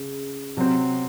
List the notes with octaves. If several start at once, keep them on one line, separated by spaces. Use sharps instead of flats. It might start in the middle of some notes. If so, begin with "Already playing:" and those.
Already playing: C#3
C3 F#3 C4